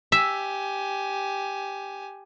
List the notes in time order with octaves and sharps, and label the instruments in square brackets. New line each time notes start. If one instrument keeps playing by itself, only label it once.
[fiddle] G4 G#5 [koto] E5